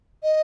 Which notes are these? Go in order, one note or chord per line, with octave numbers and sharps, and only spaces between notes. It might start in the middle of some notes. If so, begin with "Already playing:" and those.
D#5